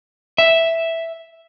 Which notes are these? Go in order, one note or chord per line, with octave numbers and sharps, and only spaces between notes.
E5